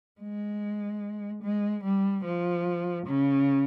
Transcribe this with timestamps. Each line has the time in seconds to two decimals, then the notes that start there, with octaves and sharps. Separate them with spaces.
0.21 G#3
1.43 G#3
1.84 G3
2.25 F3
3.07 C#3